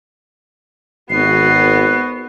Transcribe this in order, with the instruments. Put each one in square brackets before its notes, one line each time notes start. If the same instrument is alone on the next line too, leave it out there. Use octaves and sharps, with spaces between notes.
[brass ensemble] G#1 [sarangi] B3 [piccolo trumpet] F#4 [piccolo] C7